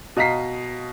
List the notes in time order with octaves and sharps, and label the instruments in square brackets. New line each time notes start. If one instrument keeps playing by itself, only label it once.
[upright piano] B2 D#5 F5 A#5 B6 C7